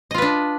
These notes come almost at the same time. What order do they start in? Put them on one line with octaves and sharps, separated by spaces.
D#5 F4 B4 D4